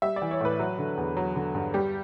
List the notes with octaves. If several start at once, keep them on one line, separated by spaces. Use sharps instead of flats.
G3 E5
D5
E3
C#5
A2 B4
F#3
D3
E2
F#3
D3
G2
G3 G4